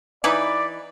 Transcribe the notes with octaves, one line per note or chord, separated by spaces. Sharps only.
E3 D#4 B4 D5